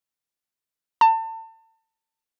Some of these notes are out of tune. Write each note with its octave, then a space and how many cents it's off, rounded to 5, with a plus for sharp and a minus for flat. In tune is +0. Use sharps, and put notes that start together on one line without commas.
A5 +30